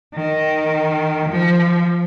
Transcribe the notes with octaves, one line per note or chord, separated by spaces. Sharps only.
D#3
F3